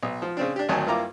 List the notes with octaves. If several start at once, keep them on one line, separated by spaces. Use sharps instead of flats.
B1
F3
C#3 C4 D4
D4 G4
G#1 D2 D#3 F#3 G#5 A5
G2 A#3 E4 F4 A#5 D6